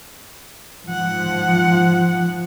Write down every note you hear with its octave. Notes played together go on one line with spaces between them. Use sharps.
G#2 F3 F#5